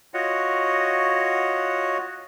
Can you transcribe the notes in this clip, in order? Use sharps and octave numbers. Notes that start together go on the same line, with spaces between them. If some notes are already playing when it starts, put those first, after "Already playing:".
F4 F#4 C#5 D#5 F#5